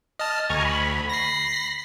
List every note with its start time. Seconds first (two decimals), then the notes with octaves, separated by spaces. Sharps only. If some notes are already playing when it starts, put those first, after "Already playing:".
0.20 D#5 A5 F6
0.50 D2 G#5 A#5 C#6
0.65 B5
1.10 A#6 C7